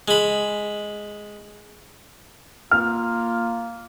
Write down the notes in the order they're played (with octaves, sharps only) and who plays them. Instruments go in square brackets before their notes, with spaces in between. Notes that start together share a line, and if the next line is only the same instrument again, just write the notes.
[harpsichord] G#3 B5
[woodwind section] A#3 F4 [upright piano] F6